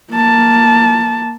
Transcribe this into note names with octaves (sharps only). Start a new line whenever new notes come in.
A#3 A5